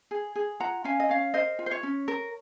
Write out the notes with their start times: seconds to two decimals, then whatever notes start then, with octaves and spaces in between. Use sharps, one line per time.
0.11 G#4
0.36 G#4
0.60 F4 F#5 A#5
0.84 C#4 F5 G#5
1.00 D#5
1.09 C#4 C#5 F5
1.34 A#4 C5 D#5
1.59 F4
1.66 C5
1.71 C#5
1.83 C#4
2.08 A#4